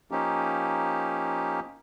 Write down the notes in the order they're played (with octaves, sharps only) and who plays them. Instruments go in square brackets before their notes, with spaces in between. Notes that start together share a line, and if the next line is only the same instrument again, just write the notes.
[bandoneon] F3 A#3 C#4 D#4 G4